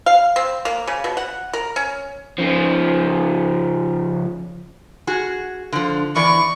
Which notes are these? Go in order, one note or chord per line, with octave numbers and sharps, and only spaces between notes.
F5
C4
A#3
C#3
B2
F#5
A#4
C#4
C#3 F3
F#4 G#4
D3 F3
E2 E3 D5 C#6